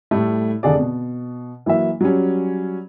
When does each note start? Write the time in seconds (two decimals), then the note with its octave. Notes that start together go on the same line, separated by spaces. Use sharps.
0.11 A2 G3 A3
0.63 F1 D3 G#4 D5
0.79 B2
1.66 E3 F#3 A#3 E5
2.01 F#3 G3 C#4